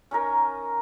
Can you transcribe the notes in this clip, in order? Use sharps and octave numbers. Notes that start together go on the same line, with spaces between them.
C#4 D#4 A#4